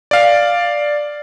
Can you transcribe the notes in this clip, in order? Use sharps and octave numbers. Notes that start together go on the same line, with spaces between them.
D5 F5